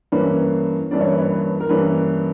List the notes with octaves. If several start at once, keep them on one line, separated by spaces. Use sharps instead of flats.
G2 E3 A#3 C#4 B4
G2 E3 A#3 C#4 D5
C#5
B4
C#5
B4
A#4
G2 E3 A#3 C#4 B4